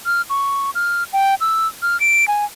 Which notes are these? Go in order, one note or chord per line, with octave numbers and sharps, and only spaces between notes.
F6
C#6
F6
G5
E6
F6
D7
G#5